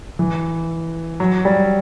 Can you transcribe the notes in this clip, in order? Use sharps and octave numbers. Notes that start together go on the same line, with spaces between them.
E3
F#3
G3